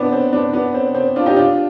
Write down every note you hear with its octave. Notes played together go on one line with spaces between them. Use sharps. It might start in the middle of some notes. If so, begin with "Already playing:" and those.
Already playing: B3 C4 D4
C4
B3 D4
B3 D4
C4
C4
D4 F4
D#4 G4
D4 F4